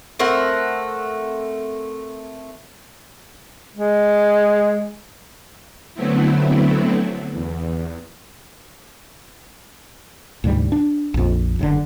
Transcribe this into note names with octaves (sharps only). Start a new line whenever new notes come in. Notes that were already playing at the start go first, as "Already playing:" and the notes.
A3 C4 A#4 F#5
G#3
D3 F#3 A3 B3 C4 E4
E2
D2 G#2 C3 G3
D4
A#1 F2
F#1 A2 D3